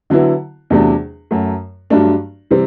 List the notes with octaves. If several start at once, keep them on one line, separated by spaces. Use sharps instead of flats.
D3 F#3 B3 E4
E2 C3 F#3 A3 D4
F#2 F#3 A3
G2 F#3 A3 D4
C3 E3 G3 C4